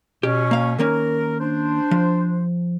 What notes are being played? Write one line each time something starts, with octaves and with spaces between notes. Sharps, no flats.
B2 C#4 G4
A#3 F5
D#3 A#3 C#4 A#4
D4 C5
F3